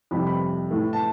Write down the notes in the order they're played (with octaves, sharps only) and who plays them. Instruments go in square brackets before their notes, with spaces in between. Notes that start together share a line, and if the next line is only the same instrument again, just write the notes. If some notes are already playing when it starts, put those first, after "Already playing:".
[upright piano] F2 C3 G3 B5
B5
A2 E3 A3
A5